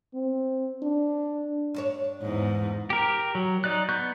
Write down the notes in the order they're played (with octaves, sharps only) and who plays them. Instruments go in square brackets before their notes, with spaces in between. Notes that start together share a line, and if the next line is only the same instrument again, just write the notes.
[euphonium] C4
D4
[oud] G2 D4 C#5
[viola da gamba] E2 G#2
[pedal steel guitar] G4 A#4
F#3
D#4 D5 F#6
B3 C#6 F#6 G6